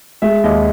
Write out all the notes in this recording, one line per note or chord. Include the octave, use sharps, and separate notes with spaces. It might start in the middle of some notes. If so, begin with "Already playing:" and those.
G#3 E5
D#2 D#5